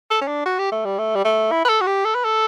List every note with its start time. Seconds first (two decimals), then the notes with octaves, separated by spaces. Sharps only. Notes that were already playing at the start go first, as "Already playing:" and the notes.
0.11 A4
0.21 C#4
0.28 D4
0.46 F#4
0.59 G4
0.72 A3
0.85 G3
0.99 A3
1.15 G3
1.25 A3
1.52 E4
1.65 B4
1.69 A4
1.81 F#4
1.87 G4
2.05 A4
2.15 B4
2.24 A4